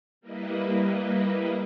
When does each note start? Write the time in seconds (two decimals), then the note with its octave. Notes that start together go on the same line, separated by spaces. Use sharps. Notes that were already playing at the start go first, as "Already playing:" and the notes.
0.21 G3 A#3 E4 B4 D#5